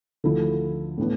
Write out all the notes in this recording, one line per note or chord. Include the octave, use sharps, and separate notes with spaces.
D2 D3 F3 A3 E4
A2 E3 B3 D4